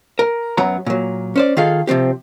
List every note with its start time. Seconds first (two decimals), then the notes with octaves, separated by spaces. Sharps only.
0.19 A#4
0.57 F#2 F#3 B3 A#5
0.86 A#2 F#3
1.36 C#4 C5 D5
1.57 D#3 F4 G#4 A4 F5
1.87 C3 F3 C4 G4